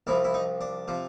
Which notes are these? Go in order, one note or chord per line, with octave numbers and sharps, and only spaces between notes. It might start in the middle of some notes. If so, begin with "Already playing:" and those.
C2 C3 F3 E4
E4
D#4
D4
C3 F3